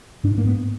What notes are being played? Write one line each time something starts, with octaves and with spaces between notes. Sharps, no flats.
G#2 D4
A#3
B3